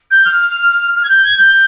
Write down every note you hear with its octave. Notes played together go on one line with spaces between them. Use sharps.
G6
F6
F6
G#6
G6
G#6
G6